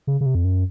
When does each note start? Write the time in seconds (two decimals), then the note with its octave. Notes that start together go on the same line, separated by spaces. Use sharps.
0.07 C#3
0.21 C#3
0.26 C3
0.35 F2
0.44 F#2